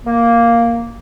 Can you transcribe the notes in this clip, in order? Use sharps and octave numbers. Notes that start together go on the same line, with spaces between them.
A#3